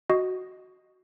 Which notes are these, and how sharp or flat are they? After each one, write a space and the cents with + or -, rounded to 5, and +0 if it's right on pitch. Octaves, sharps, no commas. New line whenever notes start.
F#4 +0 D#5 +0